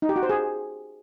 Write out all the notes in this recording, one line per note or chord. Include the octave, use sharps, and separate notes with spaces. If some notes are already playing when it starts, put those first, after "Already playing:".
D#4
G4
F#4
C5
G#4